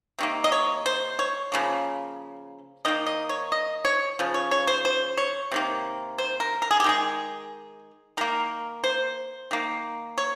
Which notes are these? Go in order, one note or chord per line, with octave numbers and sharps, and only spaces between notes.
C3 D#3 A#3
D#5
C#5
C5
C#5
C#3 F3 A#3
D#3 A#3 D#5
D#5
C#5
D#5
C#5
C#3 F3
C#5
C#5
C5
C5
C#5
C3 D#3 A#3
C5
A#4
A#4
G#4
G4
D#3 G#3 G#4
D#3 A#3 A#4
C5
D#3 A#3
C#5